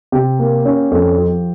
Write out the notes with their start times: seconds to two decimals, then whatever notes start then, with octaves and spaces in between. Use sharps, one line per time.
0.12 C3 G4
0.39 A#3
0.65 C#4
0.91 F2
1.18 F3